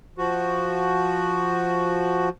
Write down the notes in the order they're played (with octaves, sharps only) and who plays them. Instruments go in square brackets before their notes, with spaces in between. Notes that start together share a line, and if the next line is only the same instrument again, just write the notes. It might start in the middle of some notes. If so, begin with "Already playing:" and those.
[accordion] F3 F#4